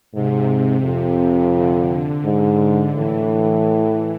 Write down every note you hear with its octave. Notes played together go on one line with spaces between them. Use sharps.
G#2 C3
F2
D3
G#2
A2 E3